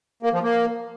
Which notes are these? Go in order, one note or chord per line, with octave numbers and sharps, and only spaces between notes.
A#3
F3
A#3